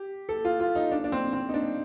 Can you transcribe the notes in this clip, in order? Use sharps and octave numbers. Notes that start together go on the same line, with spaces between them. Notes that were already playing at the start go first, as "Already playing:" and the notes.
Already playing: G4
A4
F4
F4
D#4
D4
D4
C4
C4
D#4
D4